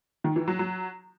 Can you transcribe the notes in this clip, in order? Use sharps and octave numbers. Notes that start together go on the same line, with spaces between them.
D#3
E3
F#3
F#3